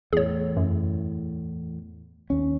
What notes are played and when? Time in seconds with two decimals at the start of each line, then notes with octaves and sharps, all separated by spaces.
0.13 E2 A2 G#4 C#5
0.57 F#2
2.30 D#2 C#4